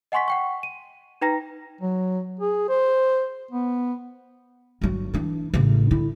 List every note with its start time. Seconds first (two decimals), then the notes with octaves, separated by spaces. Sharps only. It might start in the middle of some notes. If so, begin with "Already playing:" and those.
0.12 D#5 F#5 G#5 C6 C#6 B6
0.28 F#5 G5 C#6
0.63 D#7
1.21 D#4 B4 G5 A#5 A#6
1.81 F#3
2.40 G#4
2.69 C5
3.51 B3
4.81 G1 F#3
5.14 E3 D4
5.53 A1 C#3
5.91 D3 E4